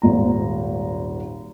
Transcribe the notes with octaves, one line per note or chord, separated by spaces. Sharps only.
D#1 G#1 A#5